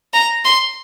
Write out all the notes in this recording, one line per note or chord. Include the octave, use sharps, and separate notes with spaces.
A#5
C6